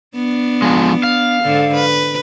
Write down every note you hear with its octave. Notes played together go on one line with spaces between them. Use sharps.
B3 D4
F3 G#3
F5
G#2 D3 A4
B4